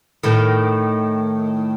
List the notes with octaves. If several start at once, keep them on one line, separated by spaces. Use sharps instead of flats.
A2 D#3